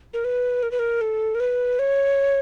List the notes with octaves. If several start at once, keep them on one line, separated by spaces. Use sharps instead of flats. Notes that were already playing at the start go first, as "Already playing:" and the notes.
A#4
B4
A#4
B4
A#4
A4
A#4
B4
C#5